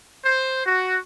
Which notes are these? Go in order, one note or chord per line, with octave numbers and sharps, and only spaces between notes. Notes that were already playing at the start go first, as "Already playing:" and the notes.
C5
F#4